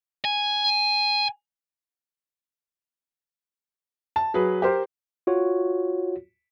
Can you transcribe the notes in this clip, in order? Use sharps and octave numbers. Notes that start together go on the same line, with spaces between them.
G#5
A5
F#3 G#4 B4
G4 A#4 C5
F4 F#4 C#5